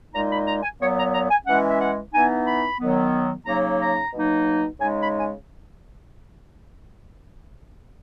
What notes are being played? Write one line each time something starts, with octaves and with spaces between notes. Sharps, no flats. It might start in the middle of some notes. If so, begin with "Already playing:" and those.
A#2 G#3 D#4 A#5
B5
A#5
G#5
A#2 F#3 B3 C#5
A#5
A#5
G#5
E3 G#3 C#4 F#5
E5
F#5
E3 B3 D#4 G#5
B5
D#3 F#3 B3
C#3 F#3 A#3 D#4 A#5
A#5
B2 F#3 A#3 D#4
C#3 G#3 D#4 G#5
B5
G#5